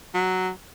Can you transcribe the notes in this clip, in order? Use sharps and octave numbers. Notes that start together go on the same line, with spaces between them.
F#3